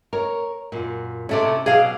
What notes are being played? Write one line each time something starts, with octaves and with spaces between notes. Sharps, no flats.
A#4 C#5
F#2 A#2
A2 C3 A3 C#4 D5
B2 F#3 G#4 D5 F5